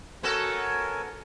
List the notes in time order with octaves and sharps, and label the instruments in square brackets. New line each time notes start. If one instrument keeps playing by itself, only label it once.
[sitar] B3 F#4 A4 [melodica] A#4 C#5 G#5